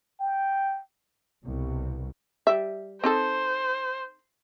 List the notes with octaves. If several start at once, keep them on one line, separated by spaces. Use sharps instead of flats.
G5
C2 B2
G3 E5
C4 D#4 A4 C5